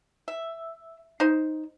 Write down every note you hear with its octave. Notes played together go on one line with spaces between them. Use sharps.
E5
D#4 C5